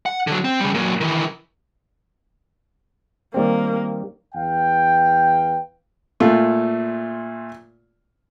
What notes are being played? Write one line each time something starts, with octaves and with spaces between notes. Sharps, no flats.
F#5
D3 F#3
C4
C#3 G3
A#2 F#3
D#3 E3
D#3 G3 A#3 C4
E2 B4 F5 G5
A#2 A3 F4